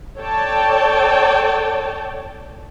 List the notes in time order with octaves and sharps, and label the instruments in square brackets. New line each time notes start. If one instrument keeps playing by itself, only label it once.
[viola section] A4 C#5 D5 G5 A5